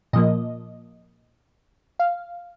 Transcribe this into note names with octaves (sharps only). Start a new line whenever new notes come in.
A#2 F3 A#3 D#5
F5